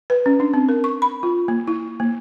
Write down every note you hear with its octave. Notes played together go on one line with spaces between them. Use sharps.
B4
C#4
D4
C4
A#4
C#6
B5
F4
A#3
E4
A#3